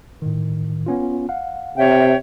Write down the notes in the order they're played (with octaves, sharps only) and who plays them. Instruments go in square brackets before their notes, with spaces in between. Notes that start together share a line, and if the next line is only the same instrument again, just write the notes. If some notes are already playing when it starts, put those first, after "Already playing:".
[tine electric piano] A2 D#3
B3 C#4 F4
F5 F#5
[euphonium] C3 [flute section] C#5 E5 G5